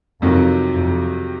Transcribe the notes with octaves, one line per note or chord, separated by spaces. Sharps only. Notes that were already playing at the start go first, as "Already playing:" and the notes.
F2 C3 D#3 F#3
F2